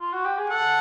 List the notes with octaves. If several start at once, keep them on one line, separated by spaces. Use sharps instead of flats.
F4
F#4
G4
G#4
A4 F#5